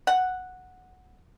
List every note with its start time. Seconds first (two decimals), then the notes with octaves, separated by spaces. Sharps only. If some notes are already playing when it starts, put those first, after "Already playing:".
0.07 F#5